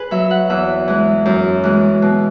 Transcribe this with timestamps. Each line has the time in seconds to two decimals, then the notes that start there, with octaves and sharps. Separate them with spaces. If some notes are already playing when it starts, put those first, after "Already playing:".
Already playing: G#4 B4
0.11 F#3 E5
0.31 F#5
0.50 E2 E5
0.88 E3 G#3
1.26 F#2
1.63 E3 G#3
2.02 B2